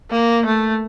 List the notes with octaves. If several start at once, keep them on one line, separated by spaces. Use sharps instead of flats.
A#3
A3